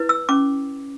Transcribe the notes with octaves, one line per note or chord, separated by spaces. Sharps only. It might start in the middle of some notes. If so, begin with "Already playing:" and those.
Already playing: E4 B4
E6
C#4 D6